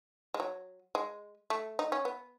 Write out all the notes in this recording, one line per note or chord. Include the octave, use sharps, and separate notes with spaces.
G#3
F#3
G#3
A3
D#4
C#4
B3